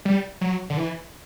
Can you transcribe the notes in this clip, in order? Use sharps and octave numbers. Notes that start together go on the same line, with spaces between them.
G3
F#3
D3
E3